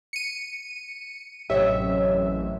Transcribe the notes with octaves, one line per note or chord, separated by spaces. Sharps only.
C#7 D#7
A1 F#2 C3 G4 C#5 D#5 E5